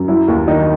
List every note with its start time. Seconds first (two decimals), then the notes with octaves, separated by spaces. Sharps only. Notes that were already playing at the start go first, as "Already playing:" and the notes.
Already playing: F#2
0.08 F#3 E4
0.28 D#2
0.48 D#3 D#4